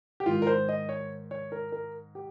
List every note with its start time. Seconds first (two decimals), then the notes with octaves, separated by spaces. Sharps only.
0.20 G4
0.26 G#2 D#3 F4
0.42 A#4
0.47 C5
0.69 D#5
0.89 C#5
1.31 C#5
1.52 A#4
1.72 A#4
2.15 G4